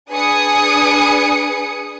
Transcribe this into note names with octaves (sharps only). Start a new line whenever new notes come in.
D4 G#4 B4 G#5 D#6 C#7